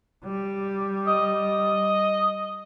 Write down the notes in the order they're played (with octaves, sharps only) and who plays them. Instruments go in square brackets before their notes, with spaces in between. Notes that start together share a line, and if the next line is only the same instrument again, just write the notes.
[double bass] G3
[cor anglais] D#5